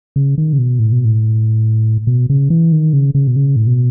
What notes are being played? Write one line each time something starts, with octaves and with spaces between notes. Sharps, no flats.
C#3
D#3
C#3
B2
A2
B2
A2
B2
C#3
E3
D#3
C#3
C#3
B2
C#3
A2
B2